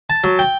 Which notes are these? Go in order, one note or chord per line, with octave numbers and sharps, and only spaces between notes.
A5
F#3
G5